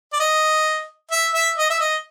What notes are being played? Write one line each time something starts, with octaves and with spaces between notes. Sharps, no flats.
D5
D#5
E5
E5
D#5
E5
D#5